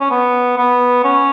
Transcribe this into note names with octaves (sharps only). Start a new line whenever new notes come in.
C#4
B3
B3
C#4